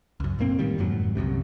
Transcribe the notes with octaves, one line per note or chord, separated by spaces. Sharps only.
C#2 F#2
F#2 A#2 A#3 C4
A2 D#3 G3
F#1 F2 G#2 F#3
G1 C2 F#2 C3